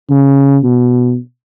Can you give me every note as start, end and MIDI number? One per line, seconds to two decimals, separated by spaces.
0.10 0.58 49
0.63 1.16 47